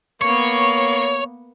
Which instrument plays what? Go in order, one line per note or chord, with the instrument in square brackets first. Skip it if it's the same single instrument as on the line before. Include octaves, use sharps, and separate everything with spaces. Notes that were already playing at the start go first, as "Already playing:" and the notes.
[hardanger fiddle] A#3 B3 [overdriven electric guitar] C#5